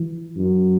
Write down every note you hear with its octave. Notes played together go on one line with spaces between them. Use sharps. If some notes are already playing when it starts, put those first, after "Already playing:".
Already playing: E3
F#2